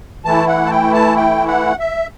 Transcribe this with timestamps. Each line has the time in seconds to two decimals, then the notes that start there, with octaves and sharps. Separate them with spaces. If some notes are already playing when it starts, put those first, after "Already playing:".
0.24 E3 A3 E4 A5
0.48 F#5
0.66 A5
0.71 G5
0.94 A5
1.17 G5
1.48 F#5
1.79 E5